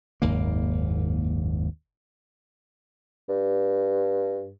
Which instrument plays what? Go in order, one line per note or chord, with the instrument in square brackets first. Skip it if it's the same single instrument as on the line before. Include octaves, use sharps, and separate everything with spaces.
[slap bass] F#1 D#2 G#2 A#3
[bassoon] G2